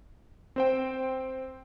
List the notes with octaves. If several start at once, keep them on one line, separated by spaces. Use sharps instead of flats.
C4 C5 G5